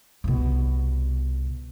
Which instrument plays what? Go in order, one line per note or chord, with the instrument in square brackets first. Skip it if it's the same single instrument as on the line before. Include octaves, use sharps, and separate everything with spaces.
[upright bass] C2 B2